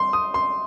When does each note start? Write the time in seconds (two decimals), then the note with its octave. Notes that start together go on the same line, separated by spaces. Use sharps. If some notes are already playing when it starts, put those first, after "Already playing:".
Already playing: C6
0.13 D#6
0.34 C6